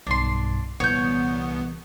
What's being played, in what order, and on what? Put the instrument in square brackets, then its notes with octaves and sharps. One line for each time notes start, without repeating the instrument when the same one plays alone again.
[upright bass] B1 G2 [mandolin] D4 C6
[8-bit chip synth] C2 B3 [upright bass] A#2 E3 [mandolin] C#5 G6